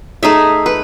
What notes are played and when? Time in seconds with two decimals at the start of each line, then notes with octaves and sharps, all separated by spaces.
0.23 A3 D#4 G#4 E5
0.66 B4